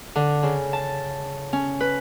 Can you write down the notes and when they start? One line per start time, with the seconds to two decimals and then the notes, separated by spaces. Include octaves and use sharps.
0.16 D3
0.43 C#3
0.73 A5
1.53 C#4
1.80 B4